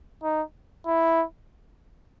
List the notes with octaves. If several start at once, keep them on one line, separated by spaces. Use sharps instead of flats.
D#4
E4